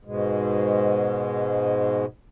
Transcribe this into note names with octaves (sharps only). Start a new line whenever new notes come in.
G#2 B2 G#3